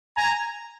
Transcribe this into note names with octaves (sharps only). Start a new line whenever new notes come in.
G#5 A#5